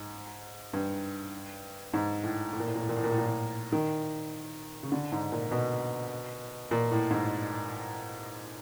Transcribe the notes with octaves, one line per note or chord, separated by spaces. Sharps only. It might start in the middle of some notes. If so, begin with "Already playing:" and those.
Already playing: G#2
G2
G#2
A2
A2
A#2
A2
A#2
A2
A#2
A2
A#2
A2
A#2
A2
D#3
C#3
D3
G#2
A#2
B2
A#2
A2
G#2